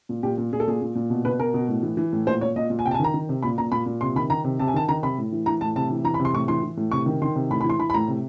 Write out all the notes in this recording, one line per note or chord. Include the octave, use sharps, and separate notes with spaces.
A#2
A#2 G4
A#2
A#2 G#4
A4
A#2 G#4
A#2
A#2
B2
B2 B4
B2 A#4
B2
A2
E3
E3
A2
A#2 C5
A#2 C#5
A#2 D#5
A#2
G#5
C3 G5
A5
G#5
D#3 A#5
D#3
C3
A#2 B5
A#2 A#5
A#2 B5
A#2
C3 C6
D#3 B5
D#3 A#5
C3
C3 A5
G#5
D#3 A5
D#3 A#5
C3 B5
A2
E3
E3 A#5
A2 A5
C3 A5
E3
E3 A#5
B5
C3
C6
A2 C#6
E3 C6
E3
A2
C3 C#6
D#3
D#3 C6
C3
A2 B5
B5
E3
C6
E3 B5
B5
A2 A#5
C3